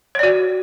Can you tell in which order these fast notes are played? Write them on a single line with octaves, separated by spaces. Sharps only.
C#5 D5 F#4